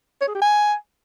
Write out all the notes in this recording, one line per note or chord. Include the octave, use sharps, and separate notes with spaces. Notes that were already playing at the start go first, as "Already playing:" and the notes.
C#5
G#4
G4
G#5